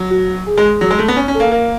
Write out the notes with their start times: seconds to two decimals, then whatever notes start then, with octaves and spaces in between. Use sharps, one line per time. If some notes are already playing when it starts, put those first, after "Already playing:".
Already playing: F#3
0.10 F#4
0.47 G#4
0.58 G#3
0.81 F#3
0.91 G#3
0.99 A3
1.08 B3
1.16 C#4
1.28 C#4
1.35 A4
1.40 A#3
1.51 A#3 A#4